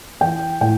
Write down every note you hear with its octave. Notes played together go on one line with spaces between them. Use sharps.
E3 G5
A2 G5